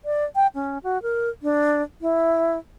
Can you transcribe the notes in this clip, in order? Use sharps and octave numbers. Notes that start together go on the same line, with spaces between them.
D5
G5
C#4
F#4
A#4
D4
E4